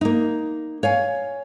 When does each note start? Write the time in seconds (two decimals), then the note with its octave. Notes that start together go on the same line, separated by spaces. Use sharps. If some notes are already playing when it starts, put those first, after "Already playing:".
0.01 A#3 D#4
0.83 C#5 F5 G#5